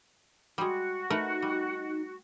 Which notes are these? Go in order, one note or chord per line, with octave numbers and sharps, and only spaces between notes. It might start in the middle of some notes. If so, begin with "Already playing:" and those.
G3 G#3 F#4
A3 D#4 A#4 B4
G3